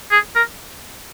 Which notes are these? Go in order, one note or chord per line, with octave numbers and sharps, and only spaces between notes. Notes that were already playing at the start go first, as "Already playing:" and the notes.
G#4
A#4